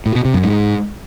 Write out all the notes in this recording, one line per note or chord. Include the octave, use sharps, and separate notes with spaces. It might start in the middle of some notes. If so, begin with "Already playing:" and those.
A2
B2
C3
F#2
G#2